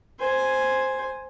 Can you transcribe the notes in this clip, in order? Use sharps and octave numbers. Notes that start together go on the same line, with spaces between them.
C5 G#5